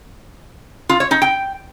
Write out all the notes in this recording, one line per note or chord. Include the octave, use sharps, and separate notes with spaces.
F4
C#5
D#4
G5